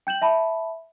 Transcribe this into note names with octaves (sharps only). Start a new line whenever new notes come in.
G5 G6 E7 F#7
E5 A5 B5